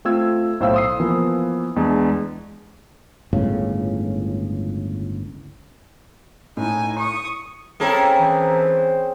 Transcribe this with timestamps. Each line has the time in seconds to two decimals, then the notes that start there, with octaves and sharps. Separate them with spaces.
0.05 A3 C4 F4 E6 G#6
0.60 B1 A2 C5 F5 E6
0.74 C6 D#6 C7
1.00 E3 F3 A#3 B3
1.76 E2 G#3 D4
3.33 G1 C#2 A2 C#3
6.57 A2 D#4 G#5
6.99 C#6 D#6
7.80 A#3 C4 C#4 E4 G#4 A4
8.19 E3 C5